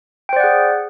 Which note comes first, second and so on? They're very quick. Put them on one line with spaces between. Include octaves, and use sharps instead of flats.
G5 C5 D5 F#5 G#4